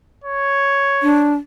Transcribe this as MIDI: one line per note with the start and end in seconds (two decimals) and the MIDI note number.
0.24 1.37 73
1.03 1.34 62